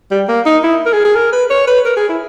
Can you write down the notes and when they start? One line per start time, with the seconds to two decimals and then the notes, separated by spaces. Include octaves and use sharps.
0.11 G3
0.29 A#3
0.46 D#4
0.64 E4
0.86 A#4
0.93 G#4
1.05 G#4
1.16 A#4
1.33 B4
1.50 C#5
1.68 B4
1.85 A#4
1.97 G#4
2.09 E4